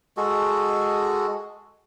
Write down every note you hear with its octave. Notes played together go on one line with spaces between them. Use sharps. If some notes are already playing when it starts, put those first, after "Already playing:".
G#3 F#4 G#4 A4